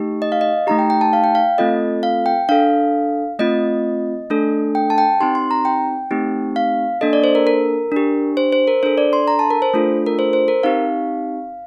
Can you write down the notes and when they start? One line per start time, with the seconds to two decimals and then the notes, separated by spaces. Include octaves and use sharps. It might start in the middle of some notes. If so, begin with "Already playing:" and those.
Already playing: A3 D#4 G4
0.22 D#5
0.32 F5
0.41 D#5
0.67 A3 D#4 G4 A#5
0.79 G5
0.90 G5
1.01 A5
1.13 F5
1.24 G5
1.35 F5
1.58 A3 C4 F4 A4 D#5
2.03 F5
2.26 G5
2.49 D4 A4 F5
3.39 A3 C4 F4 D#5
4.30 A3 D4 A4
4.75 G5
4.90 A5
4.98 G5
5.20 C4 D#4 G4 C6
5.35 C6
5.51 A#5
5.65 G5
6.11 A3 C4 D#4 G4
6.56 F5
7.01 A#3 D4 A4 D#5
7.13 D5
7.24 C5
7.35 A#4
7.47 A#4
7.92 D4 G4
8.37 C5
8.53 C5
8.67 A#4
8.83 D4 A4 C5
8.98 D5
9.13 C6
9.28 A#5
9.39 A5
9.50 A#4
9.62 C5
9.73 A3 D4 F4 A4
10.06 A#4
10.19 C5
10.33 C5
10.48 A#4
10.63 C4 D#4 G4 F5